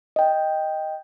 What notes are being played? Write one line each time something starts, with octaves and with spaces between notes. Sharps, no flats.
D#5 G5